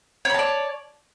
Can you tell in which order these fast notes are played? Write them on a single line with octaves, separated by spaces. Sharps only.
C#5 B5 A5 D5